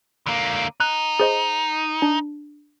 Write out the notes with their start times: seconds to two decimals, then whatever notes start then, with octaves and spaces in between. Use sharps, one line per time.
0.26 D3 A#3
0.80 D#4 F#6
1.20 G#4 C5 D#5
2.02 D4